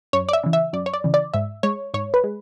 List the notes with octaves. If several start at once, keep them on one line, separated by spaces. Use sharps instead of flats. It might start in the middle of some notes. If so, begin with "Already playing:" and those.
F#2 C#5
D5
E5
C#3 E3
E5
F#2 D5
C#5
D5
C#3 E3
D5
G#2 E5
G#3 C#5
G#2 C#5
B4
G#3